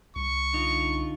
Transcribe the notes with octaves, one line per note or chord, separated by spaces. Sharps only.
C2 C#6
D3 D#4 F4